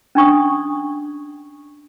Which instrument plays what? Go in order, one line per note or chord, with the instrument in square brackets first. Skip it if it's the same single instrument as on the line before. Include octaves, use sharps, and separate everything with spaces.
[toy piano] C#4 D4 C#6 D#6